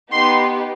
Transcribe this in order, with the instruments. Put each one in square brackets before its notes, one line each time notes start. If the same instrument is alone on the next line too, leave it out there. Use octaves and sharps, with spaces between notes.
[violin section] B3 D#4 G4 C6